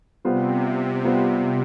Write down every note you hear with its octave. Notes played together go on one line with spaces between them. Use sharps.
C3 G3 B3 F4 C5
G3 B3 F4 C5